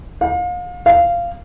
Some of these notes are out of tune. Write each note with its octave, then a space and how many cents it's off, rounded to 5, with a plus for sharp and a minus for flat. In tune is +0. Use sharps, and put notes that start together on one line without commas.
F5 +35
F5 -15